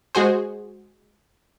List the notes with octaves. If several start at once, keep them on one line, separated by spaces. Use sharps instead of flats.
G#3 F#4 G#4 C5